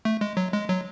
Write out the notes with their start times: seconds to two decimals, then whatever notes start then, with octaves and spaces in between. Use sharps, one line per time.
0.05 A3
0.21 G#3
0.37 F#3
0.53 G#3
0.69 F#3